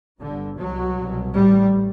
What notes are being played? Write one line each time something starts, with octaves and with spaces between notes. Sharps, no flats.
G1 G2 D3
C2 B2 F#3
C2 B2
A1 A2 G3